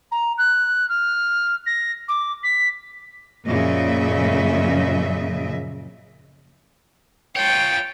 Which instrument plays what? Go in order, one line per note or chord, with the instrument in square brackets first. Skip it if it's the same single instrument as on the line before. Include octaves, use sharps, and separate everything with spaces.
[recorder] A#5
F#6
F6
A#6
D6
B6
[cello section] F#2 A#2 C#3 F3 D#5 E5
[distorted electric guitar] F4 C#5 [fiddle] G5